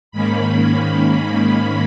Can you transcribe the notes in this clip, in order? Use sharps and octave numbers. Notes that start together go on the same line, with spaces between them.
G#2 D#3 A#3 C#4 B5